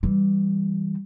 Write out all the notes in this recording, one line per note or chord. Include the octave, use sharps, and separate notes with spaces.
E3 G3